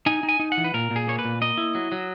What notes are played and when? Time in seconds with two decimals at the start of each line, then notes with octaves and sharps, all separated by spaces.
0.06 D#4 G#5
0.23 D#4
0.29 G#5
0.40 D#4
0.52 F#5
0.58 E3
0.64 B4
0.74 A#2 A#4
0.91 A#2
0.96 G#4
1.07 A#3 C#5
1.19 B4
1.25 A#2
1.41 A#3 D#5
1.57 E4
1.75 F#3
1.92 F#3